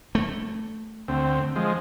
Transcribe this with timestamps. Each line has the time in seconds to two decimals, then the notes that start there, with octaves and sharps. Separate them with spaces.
0.15 A3
1.08 D2 C4
1.56 F3 G#3